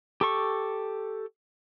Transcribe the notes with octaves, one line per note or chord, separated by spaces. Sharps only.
G4 A4 C#6